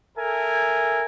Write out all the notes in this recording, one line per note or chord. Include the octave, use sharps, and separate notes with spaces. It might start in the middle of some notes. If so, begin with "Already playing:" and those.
A4 A#4 E5 G#5